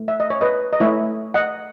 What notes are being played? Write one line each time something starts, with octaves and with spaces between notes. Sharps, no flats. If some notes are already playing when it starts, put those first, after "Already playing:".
Already playing: A3
E5
D#5
C#5
B4 D#5
D#5
A3 E4 C#5 E5
D#5 F#5